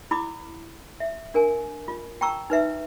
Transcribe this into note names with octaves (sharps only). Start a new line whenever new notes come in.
E4 B5 D6 D#6
E5
D4 A#4 G#5
F4
G5 A5 A#5 C#6 E6
D#4 B4 E5